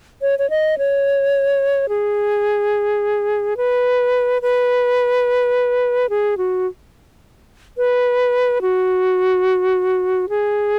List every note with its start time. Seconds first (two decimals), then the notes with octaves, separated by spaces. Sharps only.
0.22 C#5
0.39 C#5
0.50 D#5
0.78 C#5
1.89 G#4
3.57 B4
4.42 B4
6.09 G#4
6.38 F#4
7.78 B4
8.62 F#4
10.29 G#4